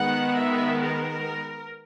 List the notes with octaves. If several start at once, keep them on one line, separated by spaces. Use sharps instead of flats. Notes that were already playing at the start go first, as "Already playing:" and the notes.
Already playing: D#3 G#3 B3 F#5
E5
A#4